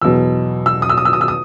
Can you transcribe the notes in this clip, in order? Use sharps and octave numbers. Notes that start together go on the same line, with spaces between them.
E2 B2 F#3 E6
E6
D#6
E6
D#6
E6
D#6
E6
D#6